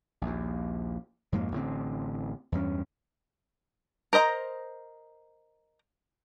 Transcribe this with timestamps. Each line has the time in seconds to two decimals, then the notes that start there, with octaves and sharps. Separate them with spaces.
0.22 A#1 D#2
1.32 F2 G#2 B2 A#3
1.52 A1 D3 C4
2.52 E2 G2 C4 C#4
4.13 A#4 C5 D#5 A#5